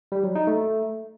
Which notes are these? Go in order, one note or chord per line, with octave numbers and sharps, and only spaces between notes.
G3
F#3
D#4
A3